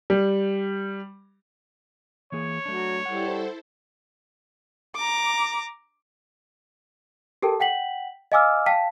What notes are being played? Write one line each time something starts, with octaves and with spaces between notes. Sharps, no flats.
G3
E3 A#3 G#4 C#5
F#3 A3 D4
G3 E4 A4 C5 F#5
A#5 D6
G4 A4 A#4 G5 A5
F#5 G5 B6 F#7
D#5 F5 G#5 D6 E6 F6
F5 G5 A5 B6